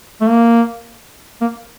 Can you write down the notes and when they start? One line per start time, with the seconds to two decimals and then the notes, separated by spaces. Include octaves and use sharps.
0.21 A3
0.28 A#3
1.41 A#3